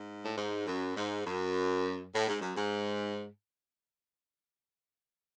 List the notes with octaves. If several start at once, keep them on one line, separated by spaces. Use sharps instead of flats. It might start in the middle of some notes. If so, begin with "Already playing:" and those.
Already playing: G#2
A2
G#2
F#2
G#2
F#2
A2
G#2
F#2
G#2